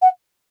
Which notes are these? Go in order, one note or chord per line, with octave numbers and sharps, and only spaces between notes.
F#5